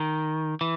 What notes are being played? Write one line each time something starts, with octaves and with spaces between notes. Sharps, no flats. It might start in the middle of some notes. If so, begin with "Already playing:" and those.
Already playing: D#3
E3